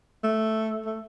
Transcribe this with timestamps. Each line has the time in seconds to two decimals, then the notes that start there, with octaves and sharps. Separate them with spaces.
0.24 A3
0.86 A3